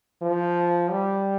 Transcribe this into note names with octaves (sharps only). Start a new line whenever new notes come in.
F3
G3